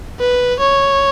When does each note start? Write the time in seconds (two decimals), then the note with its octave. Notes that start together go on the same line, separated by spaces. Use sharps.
0.20 B4
0.60 C#5